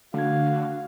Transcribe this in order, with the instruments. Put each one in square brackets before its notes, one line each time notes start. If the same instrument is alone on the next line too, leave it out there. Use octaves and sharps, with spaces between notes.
[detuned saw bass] D3 [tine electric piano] A3 D4 G#6 [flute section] F#4 [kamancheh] F5